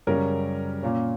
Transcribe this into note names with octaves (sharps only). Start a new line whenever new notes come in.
F#2 C#3 G3 C#4 A#4
A#2 A#3 C#4